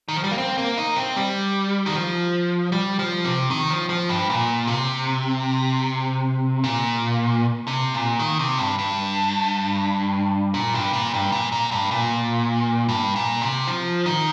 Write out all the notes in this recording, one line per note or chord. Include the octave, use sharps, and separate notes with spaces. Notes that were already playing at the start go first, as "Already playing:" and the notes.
D#3
F3
G3
A#3
C4
A#3
D#4
C4
G3
D#3
F3
G3
F3
C3
D#3
F3
F3
G2
A#2
C3
A#2
C3
A#2
D#3
C3
G2
G2
A#2
G2
A#2
G2
A#2
A#2
G2
A#2
G2
A#2
C3
F3
D#3